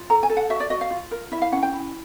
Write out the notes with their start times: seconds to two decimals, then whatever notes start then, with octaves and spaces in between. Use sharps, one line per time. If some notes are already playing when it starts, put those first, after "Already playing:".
Already playing: F4
0.10 A4 A#5
0.23 G#5
0.30 A4
0.37 F#5
0.50 F#4 E5
0.60 D5
0.70 F#4 D#5
0.81 F5
0.91 F4
1.11 A#4
1.32 E4 E5
1.42 F5
1.52 C#4 F#5
1.63 G5
1.73 E4